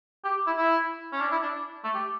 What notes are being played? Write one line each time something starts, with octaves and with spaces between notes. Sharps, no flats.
G4
E4
E4
C#4
D4
E4
D4
A3
G4